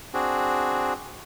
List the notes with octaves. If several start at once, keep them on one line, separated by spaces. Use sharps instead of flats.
C4 D4 F#4 G#4